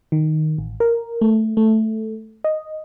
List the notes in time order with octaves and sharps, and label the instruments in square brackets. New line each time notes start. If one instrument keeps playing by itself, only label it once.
[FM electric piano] D#3
A1
A#4
A3
A3
D#5